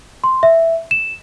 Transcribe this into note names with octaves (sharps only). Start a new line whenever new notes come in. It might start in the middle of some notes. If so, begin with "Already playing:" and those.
C6
E5
E7